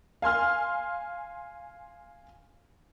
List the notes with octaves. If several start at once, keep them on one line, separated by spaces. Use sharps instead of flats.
F5 G#5 C6 F6